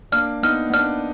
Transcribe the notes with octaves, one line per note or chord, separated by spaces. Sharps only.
A#3 D4 F6
B3 D#4 F6
B3
A#3 D4 F6